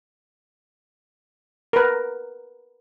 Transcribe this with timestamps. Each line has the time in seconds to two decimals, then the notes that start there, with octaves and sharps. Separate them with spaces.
1.73 A#4 B4